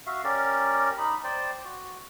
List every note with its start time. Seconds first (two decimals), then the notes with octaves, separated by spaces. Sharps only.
0.07 F#4 E5 F5
0.24 C#4 G4 A#4 D5
0.98 D#4 B5
1.24 C5 D5 G5
1.65 F#4